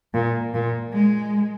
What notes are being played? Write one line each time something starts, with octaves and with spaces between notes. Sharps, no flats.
A#2
A#2
G#3